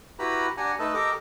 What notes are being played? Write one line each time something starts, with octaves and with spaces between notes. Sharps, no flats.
E4 F#4 G4 B4 A#5 B5
D4 G4 F#5 G#5 A#5
A3 D#4 A4 B4 D#5 A5
G4 A4 A#4 D#5 A#5 D6